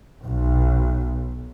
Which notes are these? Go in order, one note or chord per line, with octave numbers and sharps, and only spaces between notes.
B1